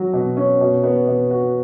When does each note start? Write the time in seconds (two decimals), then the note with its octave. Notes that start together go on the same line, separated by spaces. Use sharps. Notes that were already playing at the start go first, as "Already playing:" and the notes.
Already playing: F#3 F#4
0.13 B2
0.37 C#4
0.61 B2
0.84 B3
1.07 B2
1.31 F#4